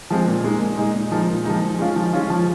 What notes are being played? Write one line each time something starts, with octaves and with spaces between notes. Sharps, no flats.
F3 G#3 C4
A#2
G#3 D#4
A#2
G#3 D#4
A#2
F3 G#3 D#4
A#2
F3 G#3 D#4
F3
G#3 C#4 F4
F3
G#3 C#4 F4
F3